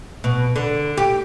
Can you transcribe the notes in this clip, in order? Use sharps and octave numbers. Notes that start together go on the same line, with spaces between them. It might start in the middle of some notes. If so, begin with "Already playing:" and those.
B2
D3
G4